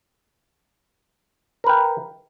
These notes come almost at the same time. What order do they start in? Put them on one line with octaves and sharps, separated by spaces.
A#4 B4 G5